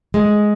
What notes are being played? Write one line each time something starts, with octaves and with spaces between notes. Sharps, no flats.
G#3